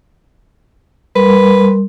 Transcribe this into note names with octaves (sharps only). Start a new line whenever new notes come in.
G3 A#4 B4 C6